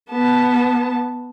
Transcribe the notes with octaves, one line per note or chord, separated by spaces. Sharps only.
B3 A5